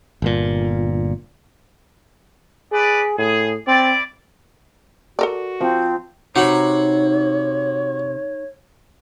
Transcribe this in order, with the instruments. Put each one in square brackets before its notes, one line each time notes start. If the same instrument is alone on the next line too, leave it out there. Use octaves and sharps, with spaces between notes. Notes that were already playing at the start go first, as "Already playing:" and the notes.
[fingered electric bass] G1 A#2
[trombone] G#4 [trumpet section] B4 D5
[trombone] A2 [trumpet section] G#4
[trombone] C4 [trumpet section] E4 D5
[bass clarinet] F#4 [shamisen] A4 A#4 D5
[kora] F3 [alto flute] C4
[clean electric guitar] C3 [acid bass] D#4 [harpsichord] F#4 F#5 B5 [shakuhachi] C#5